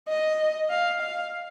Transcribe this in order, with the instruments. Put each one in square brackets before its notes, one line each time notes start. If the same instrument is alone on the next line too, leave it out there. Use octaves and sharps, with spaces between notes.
[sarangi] D#5
F5
F5